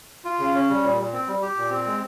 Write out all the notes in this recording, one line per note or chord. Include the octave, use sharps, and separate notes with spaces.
F4
C#3
C#4
G3
A#2
A#2
C4
G3
G4
A#2
C4
G#3